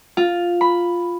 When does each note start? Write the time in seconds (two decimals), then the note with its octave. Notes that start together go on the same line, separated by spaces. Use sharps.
0.17 F4
0.61 B5